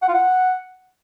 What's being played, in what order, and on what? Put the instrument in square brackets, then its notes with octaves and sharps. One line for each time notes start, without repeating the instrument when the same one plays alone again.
[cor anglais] F#5
F4
F#5